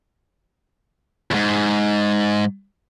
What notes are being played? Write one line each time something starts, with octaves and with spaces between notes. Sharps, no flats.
E2 G#2